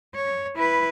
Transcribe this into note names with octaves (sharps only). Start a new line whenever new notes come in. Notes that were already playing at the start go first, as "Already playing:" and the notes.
C#5
E4 B4